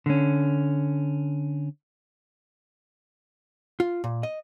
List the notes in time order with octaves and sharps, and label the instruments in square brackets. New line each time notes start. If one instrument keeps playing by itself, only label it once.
[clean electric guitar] D3 C#4
[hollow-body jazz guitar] F4
A#2
D#5